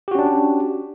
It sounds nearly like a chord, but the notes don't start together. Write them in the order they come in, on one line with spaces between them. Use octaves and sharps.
G4 F#4 C#4 D4